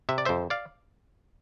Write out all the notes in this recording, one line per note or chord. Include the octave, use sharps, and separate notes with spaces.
C3 E5
D5
F2 C5 E5
D5 F5